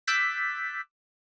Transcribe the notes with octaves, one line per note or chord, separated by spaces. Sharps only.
D6 E6 F#6 G6 A6 B6